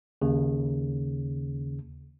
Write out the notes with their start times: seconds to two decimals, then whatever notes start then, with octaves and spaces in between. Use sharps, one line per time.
0.22 D#2 C#3